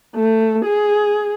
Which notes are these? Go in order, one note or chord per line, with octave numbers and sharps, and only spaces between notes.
A3
G#4